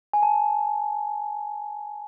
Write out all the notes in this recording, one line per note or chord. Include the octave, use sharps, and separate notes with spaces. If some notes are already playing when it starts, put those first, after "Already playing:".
G#5
A5